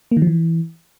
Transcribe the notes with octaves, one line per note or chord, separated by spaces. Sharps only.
A#3
D#3
F3
E3